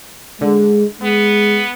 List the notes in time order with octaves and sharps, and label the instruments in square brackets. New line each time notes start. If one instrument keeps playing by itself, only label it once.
[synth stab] D3 [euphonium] G#3
[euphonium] G#3 [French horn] B3